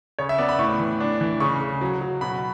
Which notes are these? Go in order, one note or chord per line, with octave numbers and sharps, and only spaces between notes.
C#3 C#5
E5
B3 D5
B5
A2 C#6
E3
D4
E3
C#3 C#6
C#3
F#3
F#3
B2 B5